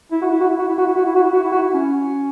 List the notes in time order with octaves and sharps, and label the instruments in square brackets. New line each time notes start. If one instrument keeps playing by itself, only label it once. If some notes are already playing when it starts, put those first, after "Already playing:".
[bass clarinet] E4
F#4
E4
F#4
E4
F#4
E4
F#4
E4
F#4
E4
F#4
E4
F#4
E4
F#4
E4
C#4